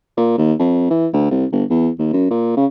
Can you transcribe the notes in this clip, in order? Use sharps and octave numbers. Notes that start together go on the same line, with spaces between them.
A#2
D#2
F2
E3
D2
C2
G1
E2
D#2
F#2
A#2
C#3